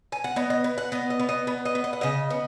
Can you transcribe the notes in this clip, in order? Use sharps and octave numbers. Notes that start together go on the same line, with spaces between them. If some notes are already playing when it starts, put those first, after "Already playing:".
G#5
F#5
B3 D#5
D#5
B3
F#5
B3 D#5
D#5
B3
D#5
B3
D#5
B3
D#5
F#5
C#3 D#5
B3